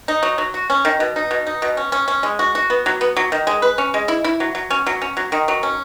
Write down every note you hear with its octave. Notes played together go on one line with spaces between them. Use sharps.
D#4
F#3
F#3
F#4
C#4
D#3
B2
D#4
B2
D#4
B2
C#4
C#4
C#4
G#3
F#4
F#4
B3
F#3
B3
F#3
D#3
G#3
B4
C#4
G#3
E4
E4
F#3
F#3
C#4
F#3
C#4
F#3
D#3
F#3
C#4